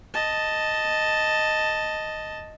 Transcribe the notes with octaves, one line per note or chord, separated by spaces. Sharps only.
D#5 A5